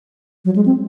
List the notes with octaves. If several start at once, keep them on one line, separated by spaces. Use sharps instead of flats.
F#3
G#3
C4